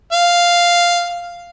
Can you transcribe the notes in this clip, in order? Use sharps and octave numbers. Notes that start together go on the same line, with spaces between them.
F5